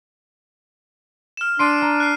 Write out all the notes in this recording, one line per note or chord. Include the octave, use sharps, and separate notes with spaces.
F6 E7
D4 C6 C7 D7 D#7
A#5
F#6 C7